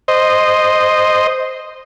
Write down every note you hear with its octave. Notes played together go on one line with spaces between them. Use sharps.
C5 D#5